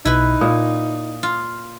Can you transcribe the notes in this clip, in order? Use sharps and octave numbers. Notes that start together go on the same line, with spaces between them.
B1 B2 D#4 E4 B4
A#2 D#6
F4